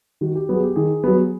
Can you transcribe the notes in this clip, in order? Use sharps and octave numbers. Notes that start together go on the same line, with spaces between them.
D#3 F#4
G4
F#3 B3 G#4
G4
D#3 G#4
F#3 B3